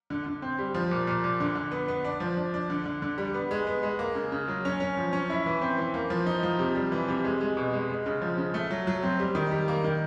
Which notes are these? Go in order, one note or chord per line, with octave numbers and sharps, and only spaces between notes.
D3
D3
C4
G3
F3
A#2
A#2
A#2
D3
D3
B3
B3
D4
F3
D4
D4
D3
D3
D3
G3
B3
G#3
B3
G#3
A#3
C#3
C#3
F#3
C#4
C#4
F3
C#4
E4
E3
C4
E3
A#3
F3
D#4
F3
C3
G3
E3
C3
G#3
G#3
B2
G#3
G#3
C#3
F3
C#3
A3
F#3
F#3
C4
G3
D#3
G3
A#3
D#3